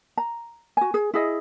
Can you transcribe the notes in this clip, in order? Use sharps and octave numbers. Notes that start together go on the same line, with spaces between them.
A#5
F#4 G#5
G#4
E4 G#4 D#5